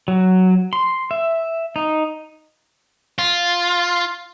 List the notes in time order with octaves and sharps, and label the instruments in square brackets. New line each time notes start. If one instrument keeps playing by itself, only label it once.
[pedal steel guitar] F#3
C6
E5
D#4
[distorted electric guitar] F4